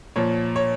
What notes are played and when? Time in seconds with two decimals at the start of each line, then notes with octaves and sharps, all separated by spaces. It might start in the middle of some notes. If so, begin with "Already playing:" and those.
0.16 A#2 F3 C#5
0.56 C#5